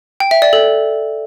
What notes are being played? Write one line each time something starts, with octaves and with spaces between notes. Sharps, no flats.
G5
E5
D5
A4